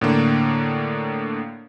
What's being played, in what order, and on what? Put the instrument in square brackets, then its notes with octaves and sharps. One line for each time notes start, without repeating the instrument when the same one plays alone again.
[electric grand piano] A2 D3 A#3